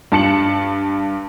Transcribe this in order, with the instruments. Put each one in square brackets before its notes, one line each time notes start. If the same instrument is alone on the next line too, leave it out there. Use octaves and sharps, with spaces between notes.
[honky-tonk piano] G2 A5 C#7 F#7